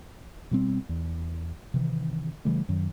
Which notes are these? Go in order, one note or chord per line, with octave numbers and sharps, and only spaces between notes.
B2 G3 C4
E2
C3 D#3 E3
C#3 E3 G3 A3
F#2 D#3 F#3